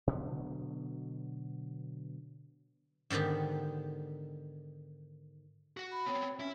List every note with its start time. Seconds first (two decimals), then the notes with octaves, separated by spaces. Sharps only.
0.07 B2 D3 F#3 B3
3.10 G#2 D3 D#3 B3 G4
5.77 F#4 F#5
5.92 B5
6.06 B3 C4 C#5
6.40 C#4 E4 E5